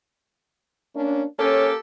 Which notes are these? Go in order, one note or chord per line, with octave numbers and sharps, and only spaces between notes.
A#3 C#4 D4
A#3 C#4 G4 A4